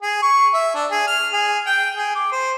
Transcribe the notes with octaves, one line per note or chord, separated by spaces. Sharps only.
G#4
C#6
E5
D4
G#4
F6
G#4
G5
G#4
D6
C5